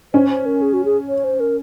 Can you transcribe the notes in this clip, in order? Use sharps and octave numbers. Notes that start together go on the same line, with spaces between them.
C#4 C5
C5
A#4
G#4
F#4
G#4
C#5
C5
A#4